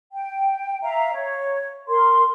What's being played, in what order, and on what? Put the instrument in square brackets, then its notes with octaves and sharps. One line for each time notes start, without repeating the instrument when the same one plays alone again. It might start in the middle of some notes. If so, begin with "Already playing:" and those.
[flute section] G5
E5 F5 A#5
C#5
A#4 C6